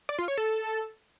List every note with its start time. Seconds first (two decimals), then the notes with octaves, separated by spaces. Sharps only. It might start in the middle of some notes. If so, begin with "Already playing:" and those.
0.09 D5
0.18 F4
0.28 C#5
0.38 A4